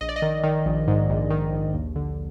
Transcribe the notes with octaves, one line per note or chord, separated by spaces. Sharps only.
A#1 D#5
D5
D#5
D#3
D#3
A#1
G#2
A#1
D#3
A#1
D#2
D3